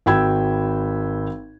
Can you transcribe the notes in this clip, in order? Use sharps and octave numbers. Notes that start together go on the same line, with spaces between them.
G#1 F#4 G5 B5 E6 G#6